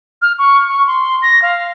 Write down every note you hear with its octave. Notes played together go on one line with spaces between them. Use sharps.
F6
C#6
C#6
C6
A#6
F5